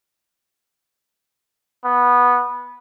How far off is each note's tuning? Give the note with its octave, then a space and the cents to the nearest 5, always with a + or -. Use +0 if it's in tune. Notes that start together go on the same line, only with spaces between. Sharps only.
B3 -10